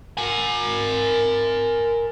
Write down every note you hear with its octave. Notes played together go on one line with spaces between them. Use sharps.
A#4 G#5